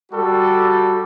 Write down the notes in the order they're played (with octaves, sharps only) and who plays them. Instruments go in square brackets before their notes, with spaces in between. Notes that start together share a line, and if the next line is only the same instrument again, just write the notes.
[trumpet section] G3 F#4 A4